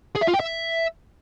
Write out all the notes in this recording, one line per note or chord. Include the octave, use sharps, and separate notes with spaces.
G#4
E5
F4
G5
E5